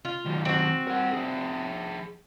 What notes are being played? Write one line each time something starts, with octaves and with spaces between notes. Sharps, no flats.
F4
D#3 F#3
C4 F#4
A#4 F#5
F3 G#4